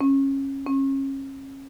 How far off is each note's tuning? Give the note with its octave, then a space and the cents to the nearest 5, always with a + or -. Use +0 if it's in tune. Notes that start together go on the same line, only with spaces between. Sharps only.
C#4 -20
C#4 -30